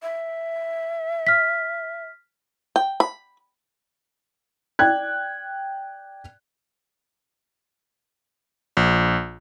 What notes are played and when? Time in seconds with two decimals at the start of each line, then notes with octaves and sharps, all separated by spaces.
0.02 E5
1.27 F6 B6
2.76 G5
3.00 B5
4.79 D5 G5 F#6 G#6
8.77 A#1